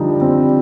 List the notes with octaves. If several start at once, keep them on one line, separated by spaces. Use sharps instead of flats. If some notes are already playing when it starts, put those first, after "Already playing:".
Already playing: D3 F3 G3 D#4
C4